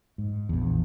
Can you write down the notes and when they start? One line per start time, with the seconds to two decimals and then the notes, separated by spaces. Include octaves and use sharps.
0.18 G#2
0.49 A#1 E2